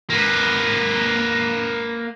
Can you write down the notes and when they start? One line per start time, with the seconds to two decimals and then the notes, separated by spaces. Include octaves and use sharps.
0.10 A#3 B4